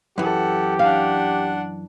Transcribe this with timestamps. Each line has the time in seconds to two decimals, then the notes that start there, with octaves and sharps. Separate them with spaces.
0.18 F#2 E3 G4 A4 F#5
0.79 D4 F5 F#5